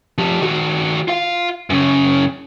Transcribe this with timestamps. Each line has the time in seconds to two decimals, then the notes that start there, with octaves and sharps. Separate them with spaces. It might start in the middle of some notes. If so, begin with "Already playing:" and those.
0.18 F3 G4
0.42 D#3 F#4
1.08 F4 F5
1.70 F#2 C#3